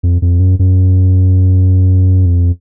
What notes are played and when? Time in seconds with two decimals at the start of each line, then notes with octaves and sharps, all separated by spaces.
0.03 F2
0.22 F2
0.40 F#2
0.59 F#2
2.26 F2